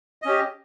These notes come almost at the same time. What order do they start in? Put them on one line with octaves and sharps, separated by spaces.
D#5 C#4 G4